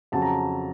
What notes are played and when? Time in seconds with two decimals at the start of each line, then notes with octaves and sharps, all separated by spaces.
0.12 F2 C#3 F#3 A5
0.22 A#5